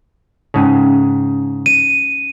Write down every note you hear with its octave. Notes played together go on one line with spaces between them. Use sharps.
G#2 C#3 C#4 D#4
D#7